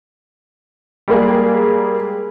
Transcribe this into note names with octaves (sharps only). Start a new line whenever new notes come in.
G3 G#3 A#3 G#4